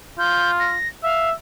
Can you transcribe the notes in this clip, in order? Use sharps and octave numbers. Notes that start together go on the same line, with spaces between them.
F4 G6
A#6
E5 F5